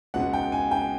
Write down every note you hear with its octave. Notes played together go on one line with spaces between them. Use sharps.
C#2 B2 F#5
G5
G#5
G5